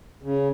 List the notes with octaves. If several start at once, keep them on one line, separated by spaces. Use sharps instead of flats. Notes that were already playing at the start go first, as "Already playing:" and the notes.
C#3